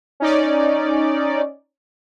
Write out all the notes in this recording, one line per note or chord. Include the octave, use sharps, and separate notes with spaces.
C#4 D#4 D5